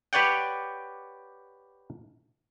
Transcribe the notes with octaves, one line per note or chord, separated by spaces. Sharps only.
G4 B4 C#5 D5 F#5 G5